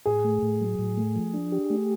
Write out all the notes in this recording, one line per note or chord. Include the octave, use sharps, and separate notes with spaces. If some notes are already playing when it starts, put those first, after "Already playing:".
A2 G#4
A3
A2
F#3
A2
A3
F3
D4
G4
A3